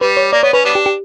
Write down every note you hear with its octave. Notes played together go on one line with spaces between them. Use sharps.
G3 B4
C#5
A#3 D5
B3 C#5
C#4 B4
G3 B3 D4
G4
G4